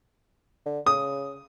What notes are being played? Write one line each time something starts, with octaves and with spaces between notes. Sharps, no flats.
D3
C#3 D#6